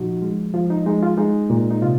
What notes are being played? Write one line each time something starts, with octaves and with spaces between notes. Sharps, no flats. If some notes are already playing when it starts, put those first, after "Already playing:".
Already playing: A#2 F3 D#4 F#4
G#3
F3 F4
D#4
G#3 D#4
F4
G#3 D#4
A#2
D#4
C3 F4